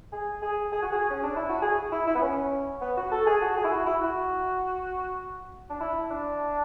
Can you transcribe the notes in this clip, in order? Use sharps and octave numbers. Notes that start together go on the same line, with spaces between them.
G#4
G#4
G#4
F#4
G#4
C#4
D4
E4
F#4
G#4
E4
E4
B3
C#4
B3
F#4
A4
G#4
F#4
G#4
E4
F#4
E4
F#4
D4
E4
D4